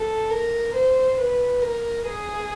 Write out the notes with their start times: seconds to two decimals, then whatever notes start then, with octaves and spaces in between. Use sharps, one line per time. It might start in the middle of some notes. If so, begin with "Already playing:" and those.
Already playing: A4
0.30 A#4
0.74 C5
1.17 B4
1.62 A#4
2.06 G#4